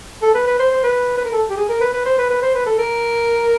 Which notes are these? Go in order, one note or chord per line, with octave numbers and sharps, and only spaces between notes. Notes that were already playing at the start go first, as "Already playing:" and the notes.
A4
B4
B4
C5
C5
B4
B4
A#4
A4
G4
G#4
A#4
B4
B4
C5
B4
B4
C5
B4
A4
A#4